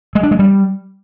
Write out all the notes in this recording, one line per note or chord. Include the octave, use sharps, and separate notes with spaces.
G#3
D4
G#3
G3